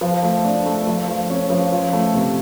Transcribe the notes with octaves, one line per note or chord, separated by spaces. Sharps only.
F3
A3
D4
A3
F3
F3
C#4
F3
F3
A3
C3